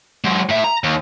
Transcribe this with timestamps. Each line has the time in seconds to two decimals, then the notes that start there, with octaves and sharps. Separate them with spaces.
0.24 F#3 G#3
0.49 A2 E5
0.64 A#5
0.84 D#2